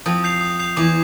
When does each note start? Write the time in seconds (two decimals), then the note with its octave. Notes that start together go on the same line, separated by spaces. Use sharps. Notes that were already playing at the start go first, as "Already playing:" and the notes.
0.06 F2 F3 D#6
0.24 G6 C7 F7
0.41 D#6
0.60 G6 C7 F7
0.77 E2 E3 D6